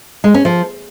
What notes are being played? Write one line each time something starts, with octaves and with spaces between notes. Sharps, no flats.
G#3
C#4
F3